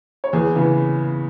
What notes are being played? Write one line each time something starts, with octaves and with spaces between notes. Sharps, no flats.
C#5
E2 G#4 B4
C#3 E3 B3